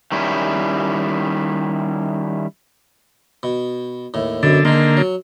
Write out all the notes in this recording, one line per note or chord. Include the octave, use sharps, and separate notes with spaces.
D#3 G3 C#4 E4
B2
D#2 A2
F#2 B2 D3 A4
D3 D#3 G#3 A#3
F#3